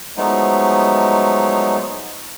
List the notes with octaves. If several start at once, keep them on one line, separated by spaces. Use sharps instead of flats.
F3 F#3 G#3 A3 B3 D#4